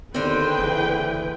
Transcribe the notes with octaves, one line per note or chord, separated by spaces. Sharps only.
D#2 D3 C4 G#4 B4 G5
F#1 E3